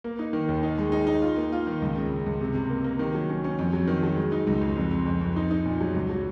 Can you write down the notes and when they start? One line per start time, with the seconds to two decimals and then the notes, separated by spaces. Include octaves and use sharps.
0.04 A#3
0.19 D#4
0.33 D#3
0.48 D#2
0.63 D#4
0.78 G#3
0.92 D#4
1.07 D#4
1.22 F4
1.37 A#3
1.52 F4
1.67 D#3
1.82 C#2
1.96 C#3
2.10 C#3
2.26 C#2
2.41 C3
2.55 C3
2.70 A#3
2.84 A#3
2.99 D#3
3.14 F#3
3.29 C#4
3.44 C#4
3.59 F2
3.73 F#3
3.87 D#3
4.03 F#3
4.17 G#3
4.32 D#4
4.47 C#2
4.61 C#2
4.77 F2
4.91 F2
5.06 F2
5.21 F2
5.36 D#4
5.51 D#4
5.65 A#2
5.80 F#3
5.95 C#2
6.09 F#3